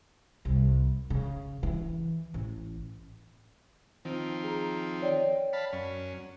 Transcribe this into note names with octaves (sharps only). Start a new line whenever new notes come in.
C2
C#3
E3
A1
D#3 F3 C4
G#4 A#5
C#5 D5 G5
F5 A5 B5
F#2 C#4